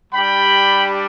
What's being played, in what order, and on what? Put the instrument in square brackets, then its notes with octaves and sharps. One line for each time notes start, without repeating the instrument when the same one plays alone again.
[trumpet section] G3 D4 G4 G5 B5